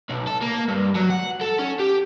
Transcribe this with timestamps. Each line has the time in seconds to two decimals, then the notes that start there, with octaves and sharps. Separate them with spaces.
0.10 B1
0.27 A4
0.42 A#3
0.69 G2
0.96 F#3
1.10 F#5
1.41 A4
1.59 C#4
1.79 G4